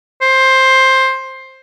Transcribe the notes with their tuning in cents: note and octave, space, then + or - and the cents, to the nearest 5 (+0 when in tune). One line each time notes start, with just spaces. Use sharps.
C5 +10